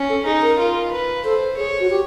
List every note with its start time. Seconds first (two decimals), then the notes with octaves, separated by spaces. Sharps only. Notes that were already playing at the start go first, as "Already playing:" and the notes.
Already playing: C#4
0.09 A4
0.26 D#4 G#4
0.42 A#4
0.59 F4
0.92 B4
1.24 A4 C5
1.57 G#4 C#5
1.80 F#4
1.90 G4